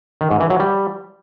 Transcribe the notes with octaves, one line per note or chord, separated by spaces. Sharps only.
D#3
G#2
E3
F#3
G3